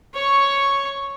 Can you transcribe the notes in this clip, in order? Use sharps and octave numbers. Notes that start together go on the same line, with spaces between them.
C#5 C#6